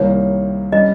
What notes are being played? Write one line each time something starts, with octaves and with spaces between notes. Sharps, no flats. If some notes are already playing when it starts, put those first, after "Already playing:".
Already playing: C2 C3 D#3 G3 A#3 C#5
G3 C#4 D#5